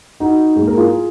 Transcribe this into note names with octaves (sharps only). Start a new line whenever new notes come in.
D#4 F#4
G#2 F#3 A#3 G#4
A#4
F4 G#4